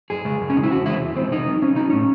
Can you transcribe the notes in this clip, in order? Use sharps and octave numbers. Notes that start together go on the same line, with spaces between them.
F#2 G#4
C#3 G#3
F#2
C#4
C#3 G#3 D#4
E4
E2 F#4
C3 E3 G#3 E4
E2
C3 E3 G#3 C4
C3 D#4
F#3
C3 C#4
F#3 D#4
A2 C#4